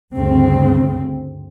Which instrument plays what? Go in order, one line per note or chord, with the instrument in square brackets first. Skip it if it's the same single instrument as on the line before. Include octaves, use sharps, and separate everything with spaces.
[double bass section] D2 G2 C#3 C4